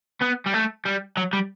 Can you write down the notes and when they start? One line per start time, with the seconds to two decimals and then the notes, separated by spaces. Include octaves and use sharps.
0.22 B3
0.46 G3
0.54 A3
0.86 G3
1.17 F#3
1.33 G3